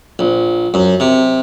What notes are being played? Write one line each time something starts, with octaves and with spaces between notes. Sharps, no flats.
A#1
F#2
C3